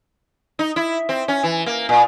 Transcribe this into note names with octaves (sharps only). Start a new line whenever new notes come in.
D#4
E4
C4
C#4
E3
A#3
A#2